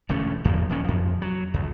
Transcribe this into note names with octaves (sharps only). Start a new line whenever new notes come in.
E1 D3 A3 C#4
D1 E2 F3 A#3
A#2 D#3 C#4
F2 F3
F#3
C#2